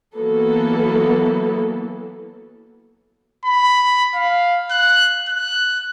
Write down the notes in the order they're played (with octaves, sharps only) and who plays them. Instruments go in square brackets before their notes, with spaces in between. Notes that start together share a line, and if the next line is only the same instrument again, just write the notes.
[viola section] E3 F#3 A#3 B3 A4
[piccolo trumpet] B5
F5
F#6
F#6